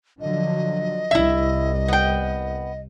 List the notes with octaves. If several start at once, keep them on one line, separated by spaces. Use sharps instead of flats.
D3 F3 F#3 D#5
C2 E4 E5
B3 G5